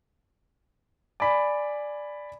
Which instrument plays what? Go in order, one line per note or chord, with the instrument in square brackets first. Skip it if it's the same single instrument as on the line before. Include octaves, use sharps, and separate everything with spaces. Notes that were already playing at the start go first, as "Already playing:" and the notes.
[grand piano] D5 G#5 B5